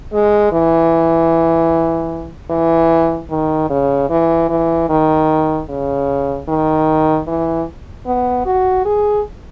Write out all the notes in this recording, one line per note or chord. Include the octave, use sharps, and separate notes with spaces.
G#3
E3
E3
D#3
C#3
E3
E3
D#3
C#3
D#3
E3
B3
F#4
G#4